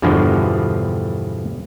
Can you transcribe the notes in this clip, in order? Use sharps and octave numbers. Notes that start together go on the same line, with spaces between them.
E2 G2 B2 D3 F3